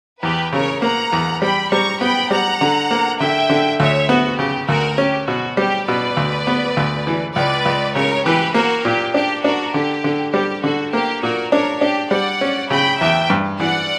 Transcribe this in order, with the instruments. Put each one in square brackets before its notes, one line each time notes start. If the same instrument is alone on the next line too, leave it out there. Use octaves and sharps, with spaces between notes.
[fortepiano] E2 [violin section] G4 B4
[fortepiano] C#3 [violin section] A#4 C#5
[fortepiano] A#3 [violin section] F#5 A#5
[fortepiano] E2
[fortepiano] G3 [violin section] G5 B5
[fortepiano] G3 [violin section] A#5 C#6
[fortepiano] B3 [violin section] G5 B5
[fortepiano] G3 [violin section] F#5 A#5
[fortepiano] D3
A#3
[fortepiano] D3 [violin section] E5 G5
[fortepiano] D3
[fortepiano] D2 [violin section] C#5 E5
[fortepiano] B3 [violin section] F#4
[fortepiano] C#3 [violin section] G4
[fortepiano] D2 [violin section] F#4 A#4
[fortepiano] C#4 [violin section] G4
[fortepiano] B2 [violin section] F#4
[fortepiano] G3 [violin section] G4
[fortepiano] B2 [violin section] B4 D5
[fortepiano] D2
B3
D2
E3
[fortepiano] C#2 [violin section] B4 D5
[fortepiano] C#2
[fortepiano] C#3 [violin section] A#4 C#5
[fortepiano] E3 [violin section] G4 B4
[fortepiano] A#3 [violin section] F#4 A#4
[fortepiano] A#2 [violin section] G4
[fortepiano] D4 [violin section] G4
[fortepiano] D4 [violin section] F#4 A#4
[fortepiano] D3 [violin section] G4
[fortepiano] D3
[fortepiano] G3 [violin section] G4
[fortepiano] D3 [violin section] F#4
[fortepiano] A#3 [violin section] G4
[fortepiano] A#2 [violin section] F#4 A#4
[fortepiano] D4 [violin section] A#4 C#5
[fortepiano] D4 [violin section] G4
[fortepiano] G3 [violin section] D5 F#5
[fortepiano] C#4
[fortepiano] C#3 [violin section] G5 B5
[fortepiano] E2 [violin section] E5 G5
[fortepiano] G2
[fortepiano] E3 [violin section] D5 F#5